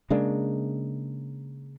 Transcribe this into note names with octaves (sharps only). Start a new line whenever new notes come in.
C#3 G#3 A#3 D4